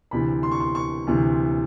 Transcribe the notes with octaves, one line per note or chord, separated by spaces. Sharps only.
D2 C3 E3 B5
C6
C#6
C6
C#6
D2 C3 E3